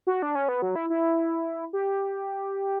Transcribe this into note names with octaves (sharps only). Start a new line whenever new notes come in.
F#4
D4
C#4
B3
F#3
E4
E4
G4